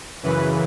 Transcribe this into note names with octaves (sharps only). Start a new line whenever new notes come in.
F#2 C#3 E3 B4